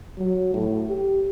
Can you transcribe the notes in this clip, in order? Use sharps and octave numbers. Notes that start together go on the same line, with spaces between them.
F#3
A2
G4